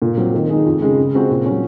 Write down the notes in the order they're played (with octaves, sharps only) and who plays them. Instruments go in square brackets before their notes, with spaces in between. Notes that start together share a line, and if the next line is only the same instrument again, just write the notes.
[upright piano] A#2
F#3 C4
D#3
G#3 D#4 G#4
F2
C#3 G#3
C#3
G#3 C4 F#4 C5
A#2
F#3 C#4